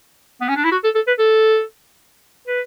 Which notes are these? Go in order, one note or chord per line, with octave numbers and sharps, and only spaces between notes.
B3
C#4
D4
E4
F#4
A4
A4
B4
A4
B4